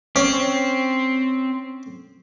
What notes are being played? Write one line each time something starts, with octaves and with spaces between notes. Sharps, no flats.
C4 C#4